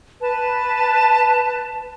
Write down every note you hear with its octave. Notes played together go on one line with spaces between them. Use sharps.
B4 A5